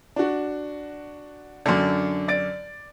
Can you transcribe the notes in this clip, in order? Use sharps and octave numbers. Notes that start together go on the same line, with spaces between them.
D4 F#4
F#2 D3 D4
D5 A6 D7